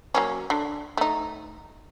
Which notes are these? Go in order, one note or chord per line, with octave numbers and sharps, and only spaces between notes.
F#3 A#3 C#4
D3
A3 D#4